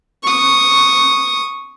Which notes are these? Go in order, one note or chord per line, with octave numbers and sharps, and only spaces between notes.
C#6 D#6